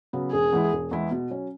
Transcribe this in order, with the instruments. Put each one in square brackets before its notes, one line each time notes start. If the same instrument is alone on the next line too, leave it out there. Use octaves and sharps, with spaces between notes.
[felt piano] C#3 F#3 B3
[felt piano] E1 [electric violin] G#4
[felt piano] E2 E3 G#3 E4
E1
E2 E3 G#3 E4
B2
F#3 C#4